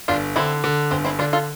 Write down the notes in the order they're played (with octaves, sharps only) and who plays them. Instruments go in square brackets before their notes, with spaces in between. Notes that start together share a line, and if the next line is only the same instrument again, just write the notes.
[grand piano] G1 [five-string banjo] D4 F4
[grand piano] D3 [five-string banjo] C4 E4
[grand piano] D3
[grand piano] G1 [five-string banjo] C4
[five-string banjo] C4 E4
[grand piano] D3 [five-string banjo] D4 F4
[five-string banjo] F4 A4